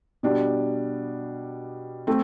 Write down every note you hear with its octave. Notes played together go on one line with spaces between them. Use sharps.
B2 G3 D4
A3 C4